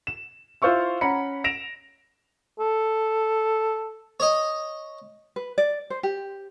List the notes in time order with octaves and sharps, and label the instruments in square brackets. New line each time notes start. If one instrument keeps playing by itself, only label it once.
[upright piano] E7
E4 F4 C5 F5 C#6 E6
C#4 F#5 A#5 B5 C#7
A#6 D7 E7 F7
[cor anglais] A4
[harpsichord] C#5 D#5
[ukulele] B4
D5
C5
G4